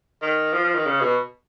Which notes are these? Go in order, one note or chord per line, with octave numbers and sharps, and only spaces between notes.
D#3
F3
F3
D#3
C#3
B2